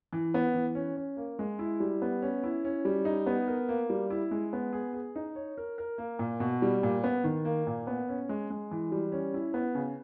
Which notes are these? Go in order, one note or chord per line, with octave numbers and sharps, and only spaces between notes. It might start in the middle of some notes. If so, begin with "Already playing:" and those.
E3
B3
E3
C#4
C#4
A#3
G#3
E4
G3
B3
C#4
E4
C#4
G3
D#4
B3
A#4
A#3
G3
E4
G#3
B3
G#4
G#4
D#4
C#5
A#4
A#4
A#3
A#2
B2
G3
A#2
B3
D#3
A#3
A#2
B3
C#4
G#3
G#3
E3
G3
C#4
E4
B3
C#3